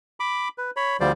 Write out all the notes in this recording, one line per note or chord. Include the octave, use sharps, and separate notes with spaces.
B5 D6
B4
C#5 B5
D2 D3 F3 G3 C5 D5